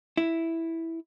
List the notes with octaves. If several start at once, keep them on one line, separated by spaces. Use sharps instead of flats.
E4